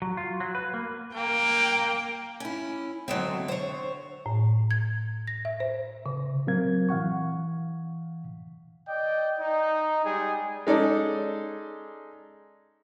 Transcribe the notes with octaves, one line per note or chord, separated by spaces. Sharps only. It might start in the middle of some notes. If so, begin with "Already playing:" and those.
F#3
F4
F#3
B4
A#3
A#3 G5
C#4 E4
D3 F#3 G#3 C4 E5
C5 C#5
A2
G#6
A#6
E5
C5
C#3
A#2 F#3 C4 A#4 F5 G#6
E3 F5 F#5 C#6
D5 D#5 G5
D#4
G3 G#3 G#4
G#3 C#4 D#4 A4 D5